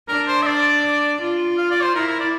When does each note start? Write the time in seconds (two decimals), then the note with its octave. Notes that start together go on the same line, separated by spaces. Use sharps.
0.08 D4 A#4
0.28 C5
0.42 E5
0.46 D5
1.21 F4
1.58 F5
1.70 D5
1.83 C5
1.95 E4 A#4
2.08 A#4
2.20 D5